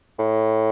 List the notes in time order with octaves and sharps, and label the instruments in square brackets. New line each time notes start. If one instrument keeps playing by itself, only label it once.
[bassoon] A2